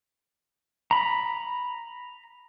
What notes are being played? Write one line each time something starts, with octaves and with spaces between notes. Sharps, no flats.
A#5 B5